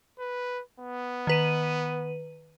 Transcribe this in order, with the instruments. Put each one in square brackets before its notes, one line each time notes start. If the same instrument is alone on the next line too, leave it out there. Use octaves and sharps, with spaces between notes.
[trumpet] B4
B3
[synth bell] D#3 B4 D#7